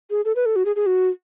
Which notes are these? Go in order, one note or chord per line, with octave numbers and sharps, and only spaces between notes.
G#4
A4
B4
A4
F#4
G#4
G#4
F#4